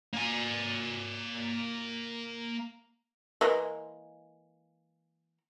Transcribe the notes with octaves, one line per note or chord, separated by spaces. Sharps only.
A#3 G#5
E3 G#3 A#3